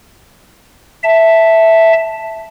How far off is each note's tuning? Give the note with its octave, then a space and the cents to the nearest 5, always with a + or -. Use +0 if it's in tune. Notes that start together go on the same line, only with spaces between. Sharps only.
E5 +0 A5 +0